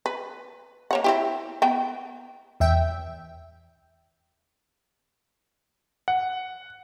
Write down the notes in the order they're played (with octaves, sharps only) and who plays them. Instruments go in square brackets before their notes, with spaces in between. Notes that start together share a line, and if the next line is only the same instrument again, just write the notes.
[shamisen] B4
A#3 C#5 F#5
C4 E4 G4
B3 G5
[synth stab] E2 E5 G5
[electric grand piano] F#5